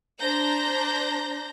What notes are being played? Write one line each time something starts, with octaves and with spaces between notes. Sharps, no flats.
D4 C5 A#5 G6 A#6